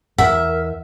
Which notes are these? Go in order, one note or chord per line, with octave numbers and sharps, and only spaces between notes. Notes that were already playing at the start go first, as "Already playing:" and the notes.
E2 A#4 E5 F#5